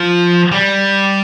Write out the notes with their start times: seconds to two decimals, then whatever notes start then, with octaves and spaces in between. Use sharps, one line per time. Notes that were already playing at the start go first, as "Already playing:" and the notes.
Already playing: F3
0.52 G3